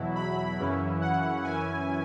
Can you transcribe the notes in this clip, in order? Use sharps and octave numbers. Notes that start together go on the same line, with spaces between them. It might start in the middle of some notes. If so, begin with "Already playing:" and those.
Already playing: E2 B2 F#3 E4
B5
F#2 C#3 E3 C#4 E4
F#5
F#2 E3 C#4 E4 G#5